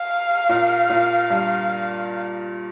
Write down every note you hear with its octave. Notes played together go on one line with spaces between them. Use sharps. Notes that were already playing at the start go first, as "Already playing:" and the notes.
Already playing: F5
A#2
A#2
G2